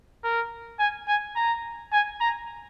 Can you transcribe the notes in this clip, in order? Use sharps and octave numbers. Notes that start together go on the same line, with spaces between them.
A#4
G#5
G#5
A#5
G#5
A#5